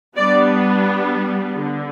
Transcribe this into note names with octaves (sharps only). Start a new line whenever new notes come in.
G3 B3 D4 D5
D3